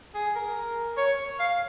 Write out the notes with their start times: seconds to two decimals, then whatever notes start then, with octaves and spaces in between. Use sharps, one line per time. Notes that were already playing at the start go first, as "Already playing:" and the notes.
0.15 G#4
0.35 A#4
0.97 C#5
1.40 F5